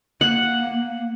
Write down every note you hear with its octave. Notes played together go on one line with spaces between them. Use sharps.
A#3 F#5